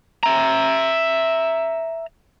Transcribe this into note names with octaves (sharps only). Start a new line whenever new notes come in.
E5 A#5